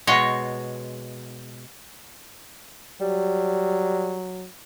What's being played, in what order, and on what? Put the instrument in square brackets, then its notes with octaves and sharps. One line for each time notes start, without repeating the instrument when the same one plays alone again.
[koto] B2 G#3 C#5
[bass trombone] F#3 [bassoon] G3